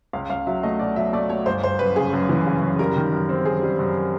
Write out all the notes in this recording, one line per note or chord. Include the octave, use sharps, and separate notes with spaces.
C#2 F5
C#2 F5
F#3 E5
A3 D#5
B2 D5
F#3 E5
A3 D5
A3 C#5
G1 C5
G1 C5
F#2 B4
C#3 G#4
F#2
E3
C#3
F#2
G3 A#4
D#3
F#2
C4
F#2 G#4
G3
F#2